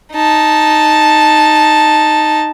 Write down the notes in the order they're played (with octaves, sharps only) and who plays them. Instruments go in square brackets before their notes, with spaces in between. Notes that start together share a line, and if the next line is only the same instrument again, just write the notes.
[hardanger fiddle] D#4 A5